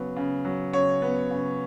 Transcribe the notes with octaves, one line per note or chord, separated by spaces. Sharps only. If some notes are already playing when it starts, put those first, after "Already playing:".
Already playing: C#3 F#3 B3
C#3
F#3
C#3 C#5
B3
C#3